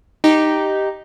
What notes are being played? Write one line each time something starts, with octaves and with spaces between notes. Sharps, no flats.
D#4 G4